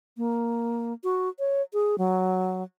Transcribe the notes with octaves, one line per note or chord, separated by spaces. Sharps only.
A#3
F#4
C#5
G#4
F#3